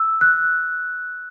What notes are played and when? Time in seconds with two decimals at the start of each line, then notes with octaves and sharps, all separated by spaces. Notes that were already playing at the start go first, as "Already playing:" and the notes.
Already playing: E6
0.21 F#6